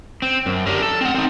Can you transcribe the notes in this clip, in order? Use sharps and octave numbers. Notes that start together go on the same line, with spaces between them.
C4
F#2
D4 G4 A#4
A4
C4 F#5
C4 D#4